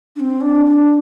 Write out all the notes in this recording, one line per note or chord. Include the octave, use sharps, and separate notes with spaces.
D4
C4
D4
D4